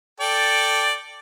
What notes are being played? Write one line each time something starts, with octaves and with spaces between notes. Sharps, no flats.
A4 D5 G5